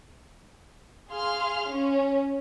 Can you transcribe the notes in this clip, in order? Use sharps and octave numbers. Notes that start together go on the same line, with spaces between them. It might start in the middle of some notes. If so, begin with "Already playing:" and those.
G#4 F5 C6 F6
C#4